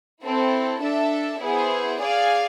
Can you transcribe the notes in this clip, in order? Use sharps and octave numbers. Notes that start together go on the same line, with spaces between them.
C4 E4 A4
D4 A4 E5
B3 E4 G#4 C5
G#4 D5 F5 G#5